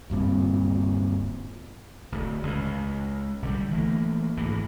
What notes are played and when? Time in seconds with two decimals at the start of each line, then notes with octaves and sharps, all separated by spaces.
0.10 D1 G2 A#2 C4
2.12 D1 D2
2.43 C#2
3.42 A#1 D3 F3 G3
3.71 E3 A3 A#3
4.37 G#1 D2 E3